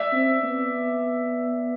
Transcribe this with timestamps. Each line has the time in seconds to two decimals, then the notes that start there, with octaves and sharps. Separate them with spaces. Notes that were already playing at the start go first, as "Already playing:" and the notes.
Already playing: D5 E5
0.12 C4
0.43 B3